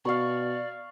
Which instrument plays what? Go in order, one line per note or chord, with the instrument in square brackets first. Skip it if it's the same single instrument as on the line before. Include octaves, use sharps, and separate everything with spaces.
[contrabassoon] B2 [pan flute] D5 [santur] F5 C#6